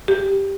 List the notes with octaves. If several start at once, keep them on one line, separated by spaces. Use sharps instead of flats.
G4